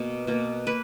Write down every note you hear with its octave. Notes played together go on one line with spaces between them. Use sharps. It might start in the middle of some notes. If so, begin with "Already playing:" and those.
Already playing: B2 A#3
B2 A#3
A#3 B4